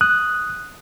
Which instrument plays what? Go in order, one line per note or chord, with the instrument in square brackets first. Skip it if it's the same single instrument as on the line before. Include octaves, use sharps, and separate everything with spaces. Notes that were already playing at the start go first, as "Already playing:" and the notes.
[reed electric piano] D#6 F#6